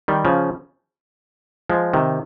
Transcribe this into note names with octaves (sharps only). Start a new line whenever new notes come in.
D#3 G3
C#3 F3
F3 G#3
C3 D#3